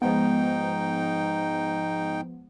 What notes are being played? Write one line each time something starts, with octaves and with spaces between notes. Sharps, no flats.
G#2 F3 G#3 B3 D#4 G5